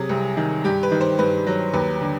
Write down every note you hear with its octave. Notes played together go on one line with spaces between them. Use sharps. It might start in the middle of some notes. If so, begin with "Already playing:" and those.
Already playing: C3 F#3 G#4
C2
D#3
G2 G4
B4
D#3
C5
G2 B4
F#3
D#2 B4
D3